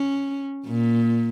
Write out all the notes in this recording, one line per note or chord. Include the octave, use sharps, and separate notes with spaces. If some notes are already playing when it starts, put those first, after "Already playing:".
Already playing: C#4
A#2